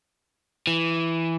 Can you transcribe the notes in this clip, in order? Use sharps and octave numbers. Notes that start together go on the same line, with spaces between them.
E3